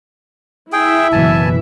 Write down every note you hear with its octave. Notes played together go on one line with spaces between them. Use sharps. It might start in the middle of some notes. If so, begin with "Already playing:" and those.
E4 G#4 E5 G5
F#1 B2 E3 G#5 A5